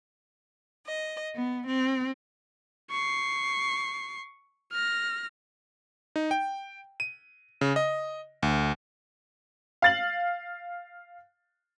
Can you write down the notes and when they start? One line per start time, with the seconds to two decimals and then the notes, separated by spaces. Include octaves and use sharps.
0.87 D#5
1.34 B3
1.66 C4
2.91 C#6 C7
4.72 F6 A#6
6.16 D#4
6.31 G5
7.00 D#7
7.61 C#3
7.76 D#5
8.43 D2
9.82 F5 A6 F#7